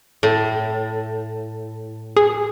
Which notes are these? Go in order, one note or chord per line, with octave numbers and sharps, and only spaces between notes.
A2
G#4